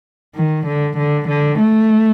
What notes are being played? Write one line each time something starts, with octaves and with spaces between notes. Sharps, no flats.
D#3
D3
D3
D3
A3